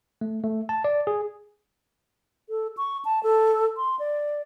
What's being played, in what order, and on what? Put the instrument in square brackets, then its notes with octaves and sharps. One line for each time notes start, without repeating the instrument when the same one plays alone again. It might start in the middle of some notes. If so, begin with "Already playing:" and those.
[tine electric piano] A3
A3
A5
D5
G#4
[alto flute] A4
C#6
A5
A4
C6
D5